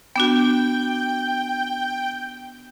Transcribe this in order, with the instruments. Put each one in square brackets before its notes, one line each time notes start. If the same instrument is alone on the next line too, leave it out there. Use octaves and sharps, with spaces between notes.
[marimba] B3 D4 F#4 [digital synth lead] G5